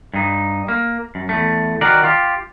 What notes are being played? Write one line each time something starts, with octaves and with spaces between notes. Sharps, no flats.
G2 D#4
A#3
F#2
E2 A3
D#3 F#4 A#4 D5
F4 G4